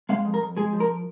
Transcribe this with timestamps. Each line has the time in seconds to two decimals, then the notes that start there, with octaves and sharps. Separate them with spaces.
0.09 G#3 F5
0.25 F2
0.34 A#4
0.41 F2
0.57 G#3 G#4
0.73 F3
0.80 A#4